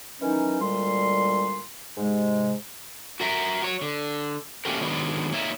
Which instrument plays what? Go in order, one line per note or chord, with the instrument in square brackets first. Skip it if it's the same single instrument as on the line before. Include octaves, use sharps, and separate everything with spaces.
[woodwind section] D#3 E3 F#3 C#4 D#4
D2 A#2 G3 G#3 C6
G#2 C3 G#3
[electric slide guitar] F#4 A#4 E5
F#4 C#5
D3
A3 A#3 C#4 F#4 G4 A#4
D#3 F#3 G#3 B3 D4
A#3 D#4 C#5 E5